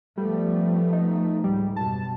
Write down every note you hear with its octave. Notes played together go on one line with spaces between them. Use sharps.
F3 G3 A3 B3
D#4
C#2 G#2 G3
F#2 B2 A5